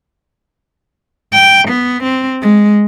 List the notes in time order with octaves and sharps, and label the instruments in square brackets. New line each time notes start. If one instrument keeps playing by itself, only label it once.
[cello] G5
B3
C4
G#3